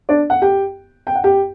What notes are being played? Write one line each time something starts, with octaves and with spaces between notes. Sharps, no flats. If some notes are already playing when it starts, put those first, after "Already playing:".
D4 D5
F#5
G4 G5
G5
F#5
G4 G5